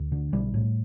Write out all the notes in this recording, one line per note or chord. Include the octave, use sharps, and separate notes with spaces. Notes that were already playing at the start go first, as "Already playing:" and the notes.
Already playing: D2
D3
B1 G3
A2